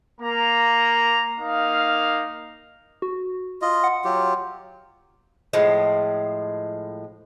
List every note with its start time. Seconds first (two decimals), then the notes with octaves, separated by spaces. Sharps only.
0.21 A#3 A#5
1.39 A#3 D#4 F5
3.02 F#4
3.62 F4 D#5
3.84 F#5
4.05 F#3 F4 G4
5.53 A2 F3 G#3